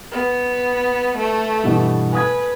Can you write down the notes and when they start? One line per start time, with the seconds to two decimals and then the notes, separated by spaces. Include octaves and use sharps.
0.12 B3
1.18 A3
1.63 G2 B2 E3
2.13 B4 G#5 D#6 G#6